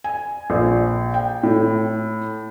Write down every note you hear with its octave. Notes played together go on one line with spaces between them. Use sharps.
G#5
A#1
G5
A2